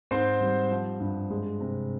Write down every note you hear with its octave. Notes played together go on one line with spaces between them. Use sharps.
G#2 C4 C5
G3
F3
G2
G#3
C3